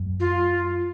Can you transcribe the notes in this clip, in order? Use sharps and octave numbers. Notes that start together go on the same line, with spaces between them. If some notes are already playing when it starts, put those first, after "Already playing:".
Already playing: F#2
F4